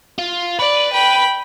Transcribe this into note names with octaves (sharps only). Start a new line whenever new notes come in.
F4
B4 D5
G5 B5